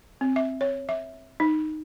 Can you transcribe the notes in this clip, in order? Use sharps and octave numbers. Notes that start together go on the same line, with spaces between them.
C4
E5
C#5
E5
D#4